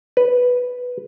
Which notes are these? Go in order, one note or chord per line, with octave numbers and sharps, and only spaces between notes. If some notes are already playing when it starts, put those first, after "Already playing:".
B4